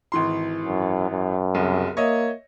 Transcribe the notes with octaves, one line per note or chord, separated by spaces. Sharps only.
G#1 E3 C6
F#2
F#2
F#1 C2
A#3 C#5 D#5 E5